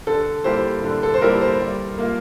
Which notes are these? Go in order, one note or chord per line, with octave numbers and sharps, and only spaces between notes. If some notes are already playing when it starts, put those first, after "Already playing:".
D3 A4
G3 A#3 E4 G4 C5
D3
A4
C5
G3 A#3 E4 G4 A#4
C5
G3
A#3 F4